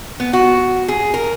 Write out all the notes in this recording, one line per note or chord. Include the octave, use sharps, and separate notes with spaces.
B3
F#4
G#4
A#4